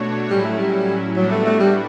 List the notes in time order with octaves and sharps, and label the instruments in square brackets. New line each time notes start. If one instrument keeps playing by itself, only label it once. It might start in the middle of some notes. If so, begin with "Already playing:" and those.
Already playing: [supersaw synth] B2 A3 D4 F#4 C#5
[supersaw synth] A2 F#3 C#4 E4 [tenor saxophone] G3
[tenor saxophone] A3
G3
[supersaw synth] A2 G3 B3 D4 F#4 [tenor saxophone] F#3
[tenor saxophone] A3
A3
G3